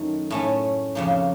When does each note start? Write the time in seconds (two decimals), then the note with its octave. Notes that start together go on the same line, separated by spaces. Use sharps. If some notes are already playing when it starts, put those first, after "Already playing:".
Already playing: F#2 D#3 A3 D#4
0.30 A2 A3 C#4
0.95 F2 C#3 F3 A#3